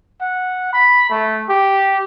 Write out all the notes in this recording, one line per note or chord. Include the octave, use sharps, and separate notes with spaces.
F#5
B5
A3
G4